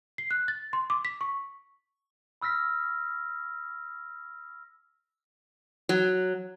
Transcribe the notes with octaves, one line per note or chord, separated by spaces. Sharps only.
C7
F#6
A6
C6
D6
B6
C#6
B5 E6 F6 A#6 B6
F#3